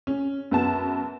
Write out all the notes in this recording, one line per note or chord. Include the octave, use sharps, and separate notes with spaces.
C#4
F#2 B3 A5